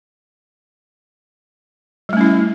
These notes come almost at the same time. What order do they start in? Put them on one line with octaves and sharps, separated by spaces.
G3 A3 C#4 E4